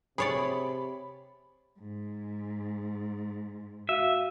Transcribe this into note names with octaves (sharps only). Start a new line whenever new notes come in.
C3 G#4 C#5 D5 B5
G#2
F#4 E5 F5 D#7